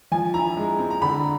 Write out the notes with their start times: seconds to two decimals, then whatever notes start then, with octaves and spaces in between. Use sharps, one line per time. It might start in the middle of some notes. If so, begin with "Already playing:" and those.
0.12 F3 G#5
0.34 E4 A#5
0.57 G#3
0.79 C4
0.91 A#5
1.02 D3 B5